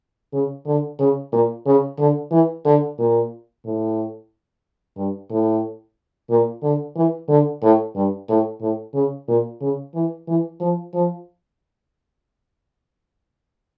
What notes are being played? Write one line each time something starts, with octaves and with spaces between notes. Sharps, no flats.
C#3
D3
C#3
A#2
C#3
D3
E3
D3
A#2
A2
G2
A2
A#2
D3
E3
D3
A2
G2
A2
A2
C#3
A#2
C#3
E3
E3
F3
F3